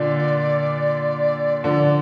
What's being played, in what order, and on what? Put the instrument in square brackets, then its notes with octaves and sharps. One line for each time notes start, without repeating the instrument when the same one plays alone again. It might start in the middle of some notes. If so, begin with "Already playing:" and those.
Already playing: [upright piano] A#2 D3 [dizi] D5
[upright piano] D3 F3 [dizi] D5